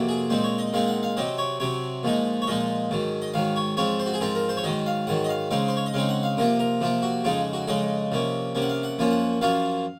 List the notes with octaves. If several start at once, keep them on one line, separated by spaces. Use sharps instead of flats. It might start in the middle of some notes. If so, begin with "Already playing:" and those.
Already playing: F2 C3 F#3 A#3
G#4
A#2 G#3 C4 D#4 C5
C#5
D#5
A#2 G#3 C4 D#4 F5
F#5
F5
C3 F#3 C4 D#5
C#5
C3 F#3 C4 C#5
A#2 F3 G#3 D#4
C#5
A#2 F3 G#3 D#4 D#5
G#2 D#3 F#3
D#5
G#2 D#3 F#3 F5
C#5
G#2 F3 C4 F4 C#5
C5
F#4
G#4
G#2 F3 C4 F4 A#4
A#4
C5
C#5
G#2 D#3 F#3 D#5
F5
G#2 D#3 F#3 F#5
D#5
F5
C#3 G#3 C4 D#4 F5
C5
C#5
D#5
C#3 G#3 C4 D#4 F5
F#5
F5
C3 F3 A#3 F4 A#4
A#4
C3 F3 A#3 F4
F#4
F2 C#3 G#3 D#4 F4
F#4
F2 C#3 G#3 D#4 D#5
C3 F3 A#3 C#4
C3 F3 A#3 C#4
F#5
F5
F#5
F#2 F3 A#3 C#4 F4
F#5
F#2 F3 A#3 C#4 F4 F5